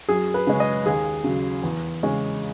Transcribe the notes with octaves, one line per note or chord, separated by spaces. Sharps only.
F#2 G#4
B4
C#3 G#3 C#4
D#5
D#2 G#4
C#3 F#3
E2
C#3 G#3 C#4